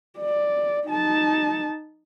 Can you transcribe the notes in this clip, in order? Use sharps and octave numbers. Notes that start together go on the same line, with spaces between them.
D5
D#4 A5